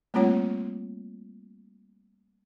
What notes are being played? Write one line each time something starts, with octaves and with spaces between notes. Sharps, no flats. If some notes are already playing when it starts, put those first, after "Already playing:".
G3 A3 A#3 C4 F4 C#5